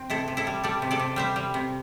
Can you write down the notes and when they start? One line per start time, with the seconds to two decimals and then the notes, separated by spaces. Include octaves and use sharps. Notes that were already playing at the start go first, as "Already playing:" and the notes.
Already playing: C4
0.10 C3 E4 A4
0.28 C3
0.37 E4 A4
0.47 G3
0.64 G3 A4 D5
0.82 C3
0.91 A4 D5
0.99 C3
1.16 G3 C5 E5
1.36 G3
1.54 C3